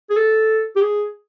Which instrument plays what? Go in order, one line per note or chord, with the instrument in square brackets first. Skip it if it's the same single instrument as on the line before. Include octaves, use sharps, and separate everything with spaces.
[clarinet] G#4
A4
G4
G#4